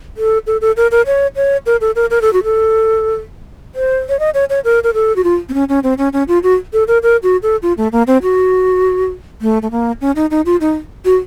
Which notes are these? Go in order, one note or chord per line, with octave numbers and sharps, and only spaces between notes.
A4
A4
A4
A#4
A#4
C#5
C#5
A#4
A4
A#4
A#4
A4
F#4
A4
C5
C#5
D#5
C#5
C#5
A#4
A#4
A4
F#4
F4
C4
C#4
C#4
C4
C#4
C#4
F4
F#4
A4
A#4
A#4
F#4
A4
F4
A3
A#3
C4
F#4
A3
A3
A#3
C#4
D#4
D#4
F4
D#4
F#4